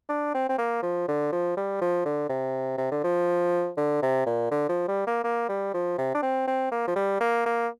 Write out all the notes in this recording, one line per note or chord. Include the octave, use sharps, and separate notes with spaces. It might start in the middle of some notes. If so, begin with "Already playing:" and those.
D4
C4
C4
A#3
F3
D3
F3
G3
F3
D3
C3
C3
D3
F3
D3
C3
A#2
D3
F3
G3
A#3
A#3
G3
F3
C3
D4
C4
C4
A#3
F3
G3
A#3
A#3